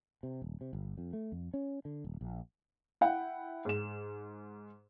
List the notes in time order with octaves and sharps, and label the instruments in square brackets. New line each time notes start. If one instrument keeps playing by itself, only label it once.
[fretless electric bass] C3
D#1
C3
G1
F2
A3
F2
C#4
D3
D#1
A#1
[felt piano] E4 F#5 G5
G#2 E7